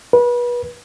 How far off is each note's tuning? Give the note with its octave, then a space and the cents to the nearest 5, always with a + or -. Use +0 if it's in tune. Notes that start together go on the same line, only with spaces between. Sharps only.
B4 -30